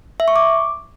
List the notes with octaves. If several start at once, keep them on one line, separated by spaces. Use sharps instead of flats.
E5
C#6
D6